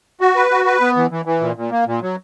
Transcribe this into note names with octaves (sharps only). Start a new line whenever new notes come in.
F#4
B4
F#4
B4
B3
E3
E3
E3
A#2
A#2
A#3
A#2
F#3